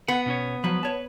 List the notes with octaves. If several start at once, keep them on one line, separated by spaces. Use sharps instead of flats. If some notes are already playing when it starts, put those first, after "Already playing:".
B3 F#5
B2 C#4 C#5
F3 F#3 B4
C#5 A5